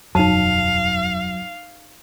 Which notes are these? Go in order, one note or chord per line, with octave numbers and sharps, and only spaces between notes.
E1 F#2 F#3 D#4 F5 A5